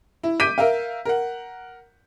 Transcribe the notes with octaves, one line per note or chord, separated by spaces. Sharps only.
E4
D6 G6 B6 D7 D#7
A#4 E5 F5
A#4 F#5